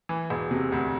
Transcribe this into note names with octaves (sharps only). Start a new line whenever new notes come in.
E3
E1
C3
D2